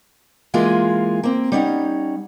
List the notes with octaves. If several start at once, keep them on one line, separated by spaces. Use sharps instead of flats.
E3 G#3 A#3 F4 G#4
A#3 C4
G3 C#4 D#4 F#5